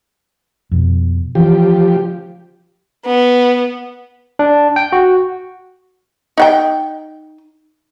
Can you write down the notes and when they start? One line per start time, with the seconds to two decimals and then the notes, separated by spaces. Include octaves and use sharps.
0.71 F2 B2
1.35 E3 F3 C#4 G4
3.05 B3
4.39 D4
4.76 G5
4.92 F#4
6.38 D#4 F#5 G5